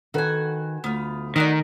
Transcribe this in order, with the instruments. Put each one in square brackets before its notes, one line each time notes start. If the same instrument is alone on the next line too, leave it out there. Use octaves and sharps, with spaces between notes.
[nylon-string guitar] D#3 A4 B4 [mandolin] F#4 G#5
[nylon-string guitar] D2 [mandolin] B3 F4
[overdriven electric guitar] D#3 [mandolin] D#4 F#4 D5